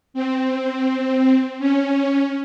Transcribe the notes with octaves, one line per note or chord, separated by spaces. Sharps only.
C4
C#4